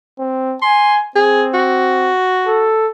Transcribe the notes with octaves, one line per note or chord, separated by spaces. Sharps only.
C4
G#5 C6
C4 G#4
F#4
A4